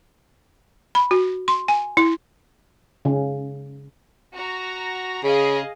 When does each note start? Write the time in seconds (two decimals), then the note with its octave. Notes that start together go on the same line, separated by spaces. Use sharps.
0.95 B5
1.11 F#4
1.48 C6
1.68 G#5
1.97 E4
3.05 C#3
4.35 F#4 A#5
5.24 C#3 G#4 D#5 F5